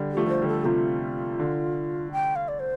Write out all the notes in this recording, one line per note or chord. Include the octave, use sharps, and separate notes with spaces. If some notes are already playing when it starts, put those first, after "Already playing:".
Already playing: D3 G3
G4
F3 A3
D3 A4
C5
F3
D3 G3
A4
C3 F3 F4
D3
G5
F5
D5
C5